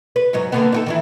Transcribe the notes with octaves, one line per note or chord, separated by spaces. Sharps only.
B4
G#2 F#3 D#4
D3 A#3 B3
D#4 F4 A4
D#3 E3 E4